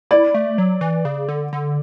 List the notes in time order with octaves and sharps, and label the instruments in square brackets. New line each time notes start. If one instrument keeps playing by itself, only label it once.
[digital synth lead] E4 [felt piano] D5
[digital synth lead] A3
F#3
E3
C#3
D3
D3